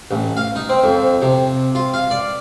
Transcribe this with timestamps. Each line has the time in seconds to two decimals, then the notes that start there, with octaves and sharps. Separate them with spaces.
0.11 A1
0.37 F5
0.55 D#4
0.69 C4
0.84 F2
1.22 C3
1.75 F4
1.94 F5
2.10 D5